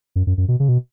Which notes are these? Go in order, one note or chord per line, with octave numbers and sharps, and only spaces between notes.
F#2
F#2
F#2
B2
C#3
B2